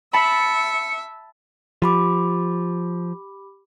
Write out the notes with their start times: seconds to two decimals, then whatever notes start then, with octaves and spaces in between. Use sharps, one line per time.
0.13 E5 A5 B5 C#7
1.82 F3 G4 B5 D6